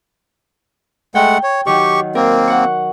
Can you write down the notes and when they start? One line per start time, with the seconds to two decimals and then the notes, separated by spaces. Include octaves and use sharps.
1.15 G#3 A3 F#5 G5
1.43 C#5
1.66 D#3 F#3 G4 C#6
2.15 A#3 C4 A#4
2.47 F#5 C#6